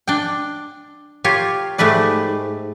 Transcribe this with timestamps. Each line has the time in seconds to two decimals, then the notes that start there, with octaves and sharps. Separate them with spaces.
0.07 D4 G5
1.24 F4 G4 A#4 C#5
1.78 G#2 A3 G4 B4 D5